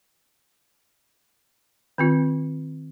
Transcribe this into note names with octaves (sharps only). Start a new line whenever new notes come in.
D#3 C4 F4